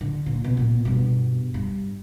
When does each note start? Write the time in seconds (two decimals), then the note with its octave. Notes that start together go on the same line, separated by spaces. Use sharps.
0.01 D3
0.26 A#2
0.44 C2 B2
0.57 A#2 C4
0.85 G2 B2
1.54 G2